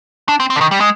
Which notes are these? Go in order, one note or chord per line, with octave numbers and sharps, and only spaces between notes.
D4
C4
C4
D3
D#3
G3
G#3